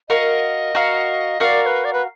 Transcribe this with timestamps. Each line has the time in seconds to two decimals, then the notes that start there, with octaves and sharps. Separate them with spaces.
0.09 F#4 A#4 D#5 F5
0.75 F#4 A#4 F5
1.40 F#4 A#4 D5 D#5 F5
1.63 D5
1.66 B4
1.85 D5
1.93 B4